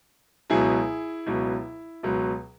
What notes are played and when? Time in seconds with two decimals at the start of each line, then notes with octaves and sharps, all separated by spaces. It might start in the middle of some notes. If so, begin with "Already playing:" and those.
0.50 C#2 B2 F#3 E4 G#4
1.26 C#2 B2 F#3 E4
2.03 C#2 B2 F#3